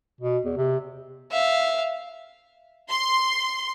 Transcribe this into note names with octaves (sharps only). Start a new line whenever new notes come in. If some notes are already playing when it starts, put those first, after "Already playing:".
B2
E2
C3
E5 F5
C6